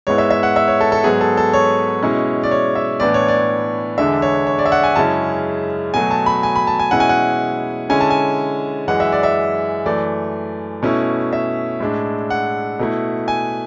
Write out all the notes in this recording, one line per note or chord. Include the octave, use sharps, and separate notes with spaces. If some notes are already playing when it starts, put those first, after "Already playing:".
G#2 G#3 B3 E4 C#5
E5
E5
F#5
E5
C#5
A4
A4
G#2 F#3 B3 G#4
A4
A4
C#5
B2 G#3 C#4 E4
D5
C#5
E5
A2 E3 B3 D4 D5
C#5
D5
E2 D3 G#3 D4 E5
C#5
C#5
D5
E5
F#5
G#5
F#2 C#3 G#3 C#4 E4 A5
B2 F#3 A3 G#5
A5
B5
G#5
B5
A5
G#5
B2 G#3 C#4 E4 F#5
G#5
F#5
D3 G#3 C#4 E4 G#5
A5
G#5
F#2 E3 G#3 F#5
E5
D5
E5
F#2 E3 A3 D5
B2 A3 C#4 E4
E5
A2 G#3 D4
F#5
B2 A3 E4
G#5